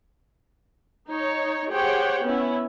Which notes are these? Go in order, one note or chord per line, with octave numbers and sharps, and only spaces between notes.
D#4 C#5
G4 G#4 C5 C#5 F#5 G5
B3 C#4 E4